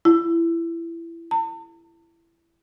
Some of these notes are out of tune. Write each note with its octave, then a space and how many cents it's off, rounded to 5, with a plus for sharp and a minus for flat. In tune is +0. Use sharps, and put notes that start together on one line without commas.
E4 +20
A5 +45